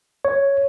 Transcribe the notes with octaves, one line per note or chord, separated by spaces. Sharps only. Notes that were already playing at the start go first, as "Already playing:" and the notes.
C#5